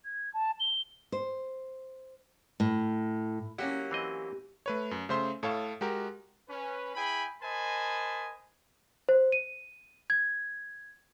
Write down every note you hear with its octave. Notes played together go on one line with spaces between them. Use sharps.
G#6
A5
G7
C5
A2
F#3 A#3 C#4 E4 G4 F#5
E3 C4 D#5
A3 B4 C#5
F#2
C#3 A3 C5 E5 C6
A2 A4 C#5 F5 A5
G#3 F#4 G4 A#4
C#4 B4
E4 G#4 G5 G#5 B5
A#4 C5 D#5 G#5 A5 B5
C5
D#7
G#6